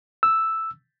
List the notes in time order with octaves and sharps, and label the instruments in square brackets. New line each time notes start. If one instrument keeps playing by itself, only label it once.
[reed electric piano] E6